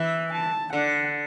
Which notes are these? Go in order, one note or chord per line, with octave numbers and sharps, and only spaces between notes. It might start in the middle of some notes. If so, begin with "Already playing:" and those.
Already playing: E3 E5
A5
D3 F#5